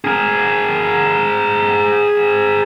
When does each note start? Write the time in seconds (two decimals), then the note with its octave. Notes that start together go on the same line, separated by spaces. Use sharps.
0.05 G#4 A#4